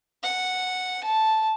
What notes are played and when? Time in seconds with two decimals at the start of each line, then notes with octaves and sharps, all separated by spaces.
0.23 F#5
1.04 A5